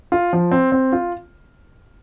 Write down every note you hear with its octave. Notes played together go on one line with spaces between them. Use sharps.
F4
F3
C4
C4
F4